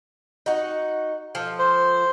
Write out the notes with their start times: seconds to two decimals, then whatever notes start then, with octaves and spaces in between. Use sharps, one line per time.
0.46 D#4 F#4
1.35 F3 A4
1.59 C5